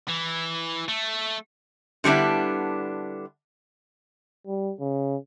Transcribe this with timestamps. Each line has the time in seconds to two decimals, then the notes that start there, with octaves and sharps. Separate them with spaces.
0.08 E3
0.88 A3
2.04 D3 G3 B3 D4 E4
4.47 G3
4.79 C#3